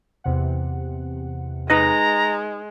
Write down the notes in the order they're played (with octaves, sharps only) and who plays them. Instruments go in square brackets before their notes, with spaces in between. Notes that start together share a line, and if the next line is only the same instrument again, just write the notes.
[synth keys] E2 C3 F#5
[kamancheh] G#3 [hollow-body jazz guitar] D#4 B4 D#5 [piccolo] A#5